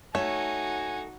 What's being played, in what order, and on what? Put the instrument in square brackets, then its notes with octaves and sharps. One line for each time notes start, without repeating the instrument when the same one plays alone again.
[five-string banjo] A3 [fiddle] D#4 F#4 [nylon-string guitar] C#5 [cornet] G#5